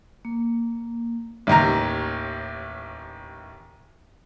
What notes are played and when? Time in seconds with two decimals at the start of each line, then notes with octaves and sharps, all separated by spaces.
0.25 A#3
1.47 A1 D#2 A#5